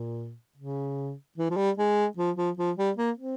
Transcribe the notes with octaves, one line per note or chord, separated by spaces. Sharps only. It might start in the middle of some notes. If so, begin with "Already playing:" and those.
Already playing: A#2
C#3
E3
F3
G3
G#3
F3
F3
F3
G3
A#3
C4